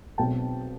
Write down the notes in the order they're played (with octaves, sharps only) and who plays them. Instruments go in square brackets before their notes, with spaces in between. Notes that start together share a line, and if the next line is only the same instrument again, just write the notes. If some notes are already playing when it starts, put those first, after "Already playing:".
[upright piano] B1 B2 G#3 C4 G5 A5